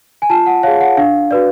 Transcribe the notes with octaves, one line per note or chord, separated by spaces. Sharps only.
G#5
F4 A5
F#5
G#4 C#5 F5
F#5
D4 F5
F#4 B4 D5